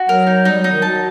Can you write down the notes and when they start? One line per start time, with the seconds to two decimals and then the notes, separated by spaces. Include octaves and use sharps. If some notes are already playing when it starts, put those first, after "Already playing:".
Already playing: F#4
0.09 F#3 A#4
0.27 D#4
0.45 G3 D#4
0.57 F#3
0.64 D#4
0.70 D#3
0.82 F#3 A5